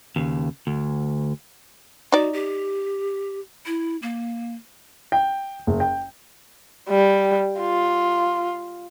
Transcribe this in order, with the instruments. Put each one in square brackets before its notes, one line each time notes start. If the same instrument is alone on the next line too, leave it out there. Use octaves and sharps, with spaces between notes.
[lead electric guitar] D#2 C#3
D2
[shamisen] D#4 D5 [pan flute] F#4
[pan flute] G4
E4
A#3
[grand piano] G5
F#1
G5
[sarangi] G3
F4